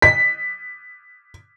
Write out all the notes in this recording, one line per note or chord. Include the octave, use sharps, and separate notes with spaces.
B6